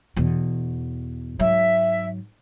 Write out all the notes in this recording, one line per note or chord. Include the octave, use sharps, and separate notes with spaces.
E2 B2
G#2 F#3 E5